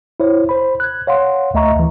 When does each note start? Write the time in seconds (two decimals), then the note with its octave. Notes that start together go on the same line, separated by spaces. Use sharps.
0.20 E4 C5 C#5
0.49 C5 B5
0.80 F#6 G#6
1.07 C#5 F5 F#5 C6
1.54 D2 A3 D#5 E5 A#5 C#6
1.76 D2 E3